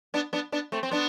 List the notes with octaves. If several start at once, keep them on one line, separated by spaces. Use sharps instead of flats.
B3 D4
B3 D4
B3 D4
A3 C4
C4
B3 D4